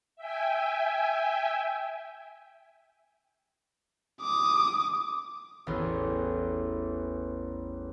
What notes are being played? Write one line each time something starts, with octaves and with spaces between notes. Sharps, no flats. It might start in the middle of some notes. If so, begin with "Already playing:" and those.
E5 G5 G#5
D6 D#6
A1 E2